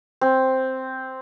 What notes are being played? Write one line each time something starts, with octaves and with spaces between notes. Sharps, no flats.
C4